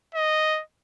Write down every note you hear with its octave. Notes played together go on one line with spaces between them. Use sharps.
D#5